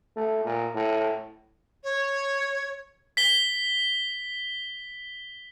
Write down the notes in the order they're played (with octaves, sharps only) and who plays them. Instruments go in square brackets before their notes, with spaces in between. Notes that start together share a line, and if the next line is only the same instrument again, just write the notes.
[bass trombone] A3
A#2
A2
[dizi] C#5
[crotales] B6 G7